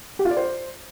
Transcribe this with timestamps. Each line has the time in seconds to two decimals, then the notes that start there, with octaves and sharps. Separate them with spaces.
0.19 G4
0.25 F4
0.31 D5
0.37 C5